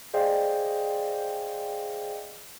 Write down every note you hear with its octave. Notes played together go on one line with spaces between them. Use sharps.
G#4 C5 D5 D#5 F5 G5